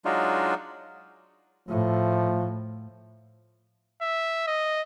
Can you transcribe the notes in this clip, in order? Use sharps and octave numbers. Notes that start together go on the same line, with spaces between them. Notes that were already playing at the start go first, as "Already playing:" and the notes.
F#3 G#3 D4 D#4 F4 F#4
A2 F3 A3
E5
D#5